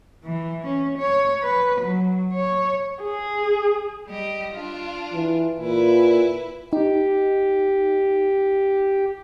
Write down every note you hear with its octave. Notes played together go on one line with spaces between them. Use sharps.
E3
C#4
C#5
B4
F#3
C#5
G#4
G3 G4 D#5
D4 F4
E3
A#2 E4 B4
D#4 G4